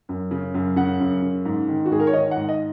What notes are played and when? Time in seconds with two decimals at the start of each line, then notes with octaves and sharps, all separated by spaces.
0.09 F#2
0.31 C#3
0.54 F#2
0.76 C#3 F#5
1.00 F#2
1.22 C#3
1.45 G#2
1.69 D#3
1.86 F#4
1.91 G#2 G#4
2.00 A#4
2.07 C#5
2.13 D#3 D#5
2.31 F#5
2.36 G#2
2.49 D#5